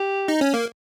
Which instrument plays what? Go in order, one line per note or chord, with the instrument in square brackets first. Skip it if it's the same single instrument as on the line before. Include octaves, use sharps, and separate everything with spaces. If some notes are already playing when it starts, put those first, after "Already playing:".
Already playing: [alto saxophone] G4
[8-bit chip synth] D#4
C#4
A#3